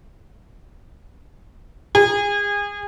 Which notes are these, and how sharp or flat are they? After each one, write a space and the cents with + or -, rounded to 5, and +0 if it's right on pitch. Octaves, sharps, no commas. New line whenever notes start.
G#4 -30